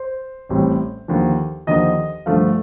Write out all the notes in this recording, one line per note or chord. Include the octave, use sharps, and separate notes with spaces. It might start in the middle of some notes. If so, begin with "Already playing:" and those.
Already playing: C5
A1 A2 G3 C4
D#2 D3 F3
D#2 D3 F3 D#5
G2 D3 F3 A3 F5